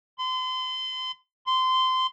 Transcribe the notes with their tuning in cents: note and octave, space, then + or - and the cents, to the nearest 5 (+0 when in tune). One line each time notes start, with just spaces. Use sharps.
C6 -35
C6 -20